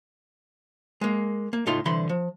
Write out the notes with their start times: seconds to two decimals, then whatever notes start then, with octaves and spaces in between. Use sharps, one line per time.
1.01 G#3 A#3
1.53 A#3
1.66 C#2 A2 A3 D#4 F4 C6
1.85 C2 D3 E3 B5 C6
2.09 F3